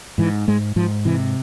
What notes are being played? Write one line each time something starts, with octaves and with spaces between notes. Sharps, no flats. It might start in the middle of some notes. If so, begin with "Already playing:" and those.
G#2 E3
G#2 G#3
G#2 F3
C3 E3